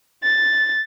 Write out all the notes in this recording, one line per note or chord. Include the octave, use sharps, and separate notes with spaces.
A6